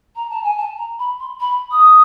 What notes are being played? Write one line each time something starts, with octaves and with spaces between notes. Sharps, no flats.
A#5
A5
G#5
A5
A#5
B5
C6
B5
D#6